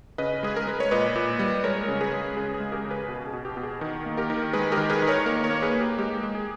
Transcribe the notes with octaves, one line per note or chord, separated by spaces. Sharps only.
C#3 B4 D#5
G#3 G#4
A#4
G#3 B4
C#5
A#2 B4 D#5
A#2
G3
G#3 A#4 C#5
C#3
G#4 B4
G#3
C#3 G#4
G#4
G#3
G4 A#4
C#3
G#4 B4
B2
G#4
B2
G4
B2
G#4
D#3
A#3
G4 A#4
D#3
G#3 G#4 B4
G4 A#4
D#3
G#4 B4
D#3
A#4 C#5
A#3 A#4 C#5
A#4 C#5
A#3
G#4 B4
A#3
G4 A#4
G#3 G4
G#3
G#4